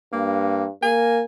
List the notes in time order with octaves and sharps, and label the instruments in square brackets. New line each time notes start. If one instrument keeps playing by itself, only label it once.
[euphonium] G2 [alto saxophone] A#3
[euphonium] A#3 [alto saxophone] G#5